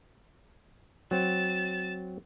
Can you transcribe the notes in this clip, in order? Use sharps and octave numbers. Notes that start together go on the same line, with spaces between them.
F#3 C4 A6 E7